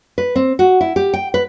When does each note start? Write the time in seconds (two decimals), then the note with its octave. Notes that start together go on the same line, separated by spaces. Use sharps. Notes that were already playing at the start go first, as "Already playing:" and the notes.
0.18 B4
0.35 C4
0.59 F#4
0.81 E4
0.96 G4
1.13 G5
1.34 B4